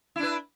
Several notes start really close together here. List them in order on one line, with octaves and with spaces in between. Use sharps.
E4 D4 B4